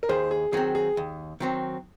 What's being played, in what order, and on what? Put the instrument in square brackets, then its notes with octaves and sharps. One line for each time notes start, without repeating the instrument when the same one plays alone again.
[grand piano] A#4
[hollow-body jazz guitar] D#2 [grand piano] G#4 C5
[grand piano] G#4
[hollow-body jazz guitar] D#3 F#3 C4 [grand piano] G#4
[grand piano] G#4
[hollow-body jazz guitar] D#2
D#3 F#3 C4